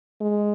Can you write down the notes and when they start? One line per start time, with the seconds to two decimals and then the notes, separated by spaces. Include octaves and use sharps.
0.21 G#3